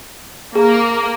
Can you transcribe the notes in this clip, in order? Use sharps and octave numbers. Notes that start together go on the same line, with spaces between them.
A#3 G#4